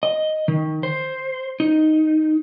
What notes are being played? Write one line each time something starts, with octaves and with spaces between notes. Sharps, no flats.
D#5
D#3
C5
D#4